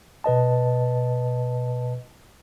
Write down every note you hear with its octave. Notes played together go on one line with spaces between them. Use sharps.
B2 B4 D#5 A5